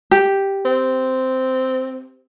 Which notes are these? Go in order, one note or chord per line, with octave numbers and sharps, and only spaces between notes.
G4
C4